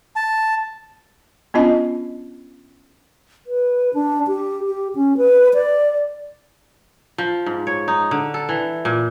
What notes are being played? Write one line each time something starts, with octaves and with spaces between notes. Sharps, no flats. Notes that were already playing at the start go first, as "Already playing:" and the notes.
A5
B3 C#4 D4 F4 D#5 A5
B4
D4
G4
G4
C#4
B4
D5
F3
G#2
C#5
D#4
D3
A4
E3
A#2